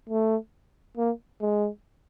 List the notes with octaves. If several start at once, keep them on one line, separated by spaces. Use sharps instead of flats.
A3
A#3
G#3